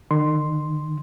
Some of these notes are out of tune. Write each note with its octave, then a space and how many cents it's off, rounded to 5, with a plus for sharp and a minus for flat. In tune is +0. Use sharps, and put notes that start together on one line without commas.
D#3 -40 C6 +0